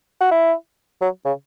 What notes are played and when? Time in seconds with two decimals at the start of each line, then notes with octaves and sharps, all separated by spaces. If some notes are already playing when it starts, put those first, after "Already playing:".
0.21 F#4
0.31 E4
1.01 F#3
1.25 C#3